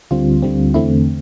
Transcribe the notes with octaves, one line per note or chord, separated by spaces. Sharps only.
D2 D3 G3 C4 F4
D2 D3 G3 C4
E2 D3 A3 C4 E4